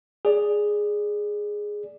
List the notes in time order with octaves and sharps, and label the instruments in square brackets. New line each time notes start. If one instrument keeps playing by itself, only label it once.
[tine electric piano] G#4 D5